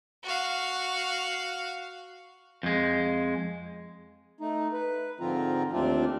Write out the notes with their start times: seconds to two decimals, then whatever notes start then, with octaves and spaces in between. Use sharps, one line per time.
0.24 F#4 F5
2.63 F2 G#3
4.40 A3 D#4
4.73 B4
5.20 G#2 D3 F3 C4 F4 A#5
5.73 D#2 A3 C4 D4 F4